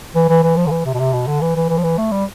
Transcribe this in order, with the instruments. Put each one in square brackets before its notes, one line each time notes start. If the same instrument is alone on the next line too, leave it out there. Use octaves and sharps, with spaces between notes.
[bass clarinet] E3
E3
E3
F3
D3
E3
C3
B2
C3
B2
D3
E3
E3
E3
F3
E3
A3
G3